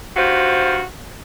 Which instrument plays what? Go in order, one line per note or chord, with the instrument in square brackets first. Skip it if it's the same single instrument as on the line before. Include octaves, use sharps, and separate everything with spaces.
[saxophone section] G2 F4 F#4 C5